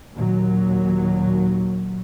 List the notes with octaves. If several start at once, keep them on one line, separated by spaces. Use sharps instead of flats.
D#2 A#2 F#3